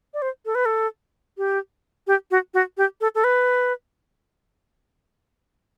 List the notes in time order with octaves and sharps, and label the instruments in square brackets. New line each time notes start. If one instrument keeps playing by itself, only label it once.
[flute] D5
C5
A4
B4
A4
G4
G4
F#4
F#4
G4
A4
A4
B4